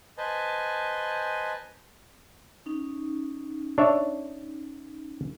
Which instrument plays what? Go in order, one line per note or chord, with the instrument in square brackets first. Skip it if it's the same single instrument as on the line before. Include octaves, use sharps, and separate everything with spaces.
[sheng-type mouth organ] B4 C5 D#5 G#5 A5
[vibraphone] C#4 D#4
[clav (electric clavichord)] D4 C#5 E5